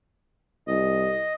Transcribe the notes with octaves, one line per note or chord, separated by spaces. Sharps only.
C2 D#5